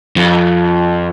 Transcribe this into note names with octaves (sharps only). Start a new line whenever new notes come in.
F2